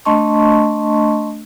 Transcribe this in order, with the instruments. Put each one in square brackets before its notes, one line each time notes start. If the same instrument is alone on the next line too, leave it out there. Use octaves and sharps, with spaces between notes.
[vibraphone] A3 D4 D#5 A5 C6 C#6